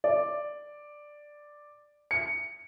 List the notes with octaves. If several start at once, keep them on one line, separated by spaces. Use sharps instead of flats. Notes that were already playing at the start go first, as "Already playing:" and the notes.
D5
C#7